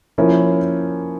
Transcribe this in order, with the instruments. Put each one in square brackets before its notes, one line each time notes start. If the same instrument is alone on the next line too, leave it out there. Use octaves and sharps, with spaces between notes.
[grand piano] F3 A#3 C#4 E4